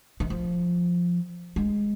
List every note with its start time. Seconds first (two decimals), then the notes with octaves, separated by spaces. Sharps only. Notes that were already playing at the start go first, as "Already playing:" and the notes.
0.20 D#3
0.30 F3
1.56 G#3